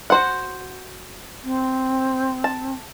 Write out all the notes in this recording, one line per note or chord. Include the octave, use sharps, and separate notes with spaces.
F#4 C5 F#5
C4
A5